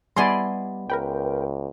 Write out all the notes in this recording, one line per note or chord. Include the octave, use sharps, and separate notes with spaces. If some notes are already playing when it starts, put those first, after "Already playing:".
G3 B3 E4 D5 D#5 G#5 C6
C#2 A#4 B4 G5